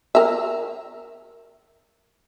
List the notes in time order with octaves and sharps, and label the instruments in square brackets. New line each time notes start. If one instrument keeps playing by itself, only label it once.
[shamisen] A#4 E5